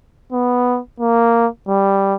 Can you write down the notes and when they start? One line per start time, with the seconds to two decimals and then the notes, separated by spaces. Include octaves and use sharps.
0.32 B3
1.00 A#3
1.68 G3